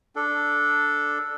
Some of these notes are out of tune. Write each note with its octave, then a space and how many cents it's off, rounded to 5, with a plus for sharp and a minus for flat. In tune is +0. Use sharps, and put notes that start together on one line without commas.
D4 +0 A4 +0 D5 +0